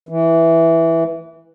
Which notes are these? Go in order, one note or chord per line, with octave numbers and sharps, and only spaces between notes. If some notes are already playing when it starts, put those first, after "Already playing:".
E3